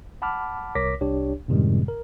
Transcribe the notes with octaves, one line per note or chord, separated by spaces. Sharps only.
F#5 A5 B5 D6 F6
C2 A#4 C#5 D6 A#6 B6
C2 D4 G4 C#5
F#2 A2 C3 D#3 G3 G#3
A#4